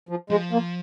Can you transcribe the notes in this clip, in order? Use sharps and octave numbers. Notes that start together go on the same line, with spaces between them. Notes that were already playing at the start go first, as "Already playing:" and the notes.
F3
F3 G#3
A#3